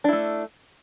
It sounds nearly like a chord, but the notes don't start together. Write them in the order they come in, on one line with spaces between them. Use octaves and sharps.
D4 E4 A3